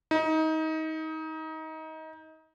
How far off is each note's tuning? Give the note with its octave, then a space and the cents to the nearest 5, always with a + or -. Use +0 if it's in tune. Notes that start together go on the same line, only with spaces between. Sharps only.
D#4 +25